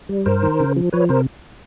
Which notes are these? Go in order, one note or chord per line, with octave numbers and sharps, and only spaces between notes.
G3
G2 A#4 C5
D#3
C#3
F3
F3 B4 C#5
C3 A#4 C5